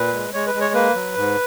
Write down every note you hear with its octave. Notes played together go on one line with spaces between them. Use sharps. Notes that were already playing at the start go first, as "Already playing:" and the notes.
Already playing: A#2 B4
G#3
G#3 C#5
B4
G#3
C#5
A#3 B4
F#3
G#2